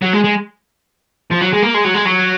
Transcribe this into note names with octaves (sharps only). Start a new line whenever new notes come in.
F#3
G#3
G#3
F3
F#3
G#3
A#3
G#3
F#3
G#3
F#3